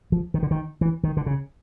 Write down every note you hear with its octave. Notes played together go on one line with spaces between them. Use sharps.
F3
D#3
D3
D#3
E3
D#3
D3
C#3